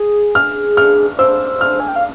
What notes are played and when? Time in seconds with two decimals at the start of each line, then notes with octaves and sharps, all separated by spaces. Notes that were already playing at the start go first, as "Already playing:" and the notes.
Already playing: G#4
0.35 F6
0.77 F6
1.18 C5 E6
1.61 F6
1.80 G#5
1.88 G5
1.96 F5